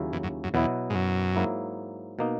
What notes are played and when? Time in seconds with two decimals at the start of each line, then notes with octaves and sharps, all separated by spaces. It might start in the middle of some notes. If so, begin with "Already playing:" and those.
Already playing: D#2 C#3 F#3 C#4 E4
0.13 E2
0.23 F#2
0.44 F#2
0.54 E2 B2 F#3 B3 E4
0.90 G#2
0.95 F#2
1.36 G#2 F#3 A#3 E4
2.19 B2 A#3 D#4